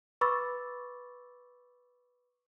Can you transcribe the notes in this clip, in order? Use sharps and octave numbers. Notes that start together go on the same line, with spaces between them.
B4 B5 C#6 D6 E6 A6